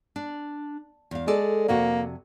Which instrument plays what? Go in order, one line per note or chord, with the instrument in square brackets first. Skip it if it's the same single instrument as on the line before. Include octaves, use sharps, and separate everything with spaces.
[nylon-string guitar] D4
E2 F5
[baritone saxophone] G#3 [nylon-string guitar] A4 D5
[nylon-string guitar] F2 C3 F#4 [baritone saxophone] A#3